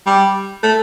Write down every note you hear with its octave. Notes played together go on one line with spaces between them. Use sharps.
G3
A3